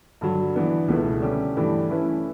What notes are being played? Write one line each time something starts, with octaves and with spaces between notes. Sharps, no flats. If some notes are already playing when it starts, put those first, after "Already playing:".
G2 D3 F#3
E3 B3 D4
C#2 B2 A3 E4 B4
D3 G3 C#4 G4
G2 E3 A3 D4 G4
E3 A3 C#4 E4 B4